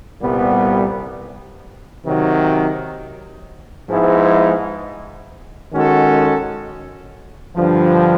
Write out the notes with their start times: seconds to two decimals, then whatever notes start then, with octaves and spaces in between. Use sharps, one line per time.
0.20 C2 A#2 G3 B3
2.04 C3 D#3 F#3
3.88 G#2 F3 G#3 B3 E4
5.72 D#3 G#3 C#4 F#4 A4
7.56 G2 D3 F3